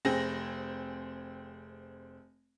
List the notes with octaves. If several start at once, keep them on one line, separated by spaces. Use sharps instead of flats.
F1 C4 G#4 A#6